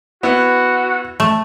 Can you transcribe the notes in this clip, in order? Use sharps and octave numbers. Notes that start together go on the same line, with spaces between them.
B3 E4 F#4
A3